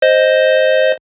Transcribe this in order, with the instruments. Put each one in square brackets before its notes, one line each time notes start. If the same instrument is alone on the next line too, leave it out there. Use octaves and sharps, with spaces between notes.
[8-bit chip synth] C5 D#5